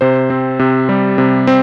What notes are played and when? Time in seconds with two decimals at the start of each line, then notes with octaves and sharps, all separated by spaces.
0.01 C3 C5
0.30 C4
0.59 C3
0.89 G3
1.18 C3
1.47 C4